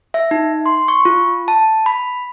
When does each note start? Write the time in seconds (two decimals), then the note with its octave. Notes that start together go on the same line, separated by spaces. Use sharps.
0.14 E5
0.31 D#4
0.66 C6
0.88 C#6
1.05 F4
1.48 A5
1.86 B5